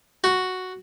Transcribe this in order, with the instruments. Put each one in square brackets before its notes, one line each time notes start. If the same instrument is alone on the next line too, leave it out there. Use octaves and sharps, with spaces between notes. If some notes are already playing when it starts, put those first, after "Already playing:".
[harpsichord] F#4